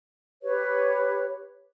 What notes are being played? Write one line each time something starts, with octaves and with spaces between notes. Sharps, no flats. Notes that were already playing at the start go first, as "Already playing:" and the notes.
G4 B4 C#5